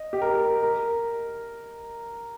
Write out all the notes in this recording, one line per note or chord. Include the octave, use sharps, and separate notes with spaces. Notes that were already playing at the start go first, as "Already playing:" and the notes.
Already playing: D#5
G4
A#4
A#4